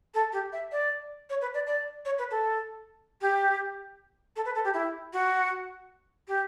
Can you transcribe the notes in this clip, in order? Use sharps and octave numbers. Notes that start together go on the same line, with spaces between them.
A4
G4
E5
D5
C#5
B4
D5
D5
C#5
B4
A4
G4
A4
B4
A4
G4
E4
F#4
G4